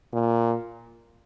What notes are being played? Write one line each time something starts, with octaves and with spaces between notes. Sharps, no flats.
A#2